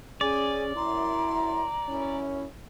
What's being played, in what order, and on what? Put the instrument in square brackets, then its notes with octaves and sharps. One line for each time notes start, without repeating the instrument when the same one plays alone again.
[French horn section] C#4 [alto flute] G#4 [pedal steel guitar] D5 [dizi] G#5
[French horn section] F#2 E4 [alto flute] A#5 [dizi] C6
[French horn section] F#2 C#4 [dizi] E4